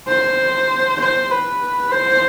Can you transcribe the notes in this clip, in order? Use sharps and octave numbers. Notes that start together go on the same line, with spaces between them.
C5
C5
B4
C5